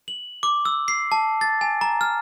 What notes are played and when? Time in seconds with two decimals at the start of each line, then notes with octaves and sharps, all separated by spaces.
0.08 F#7
0.43 D6
0.65 E6
0.88 C7
1.12 A5
1.41 A6
1.61 G#5
1.81 A#5
2.01 F6